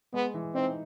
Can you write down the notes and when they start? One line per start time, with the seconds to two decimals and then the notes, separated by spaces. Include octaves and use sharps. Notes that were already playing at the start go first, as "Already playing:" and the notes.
0.14 G#3 B3
0.34 E3
0.54 C4 D#4